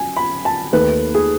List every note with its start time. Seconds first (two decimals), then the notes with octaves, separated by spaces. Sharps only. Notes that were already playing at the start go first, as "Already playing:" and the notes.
Already playing: F#2 G#5
0.17 B5
0.45 A5
0.73 D#2 D#3 A3 B4
1.15 G#4